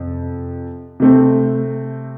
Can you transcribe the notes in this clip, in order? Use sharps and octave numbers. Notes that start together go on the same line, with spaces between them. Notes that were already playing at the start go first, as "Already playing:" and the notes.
Already playing: F2 C3
C3 A3 C4